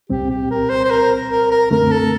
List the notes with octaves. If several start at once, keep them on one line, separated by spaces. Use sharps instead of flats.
C2 A#2 G3 C4 G4
G4
A#4
C5
C5
A#4
A#4
A#4
F#2 D3 A3 C4 A#4
A4